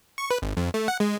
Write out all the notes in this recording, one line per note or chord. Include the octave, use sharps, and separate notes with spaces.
C#6
B4
G#1
F2
A3
F#5
G#3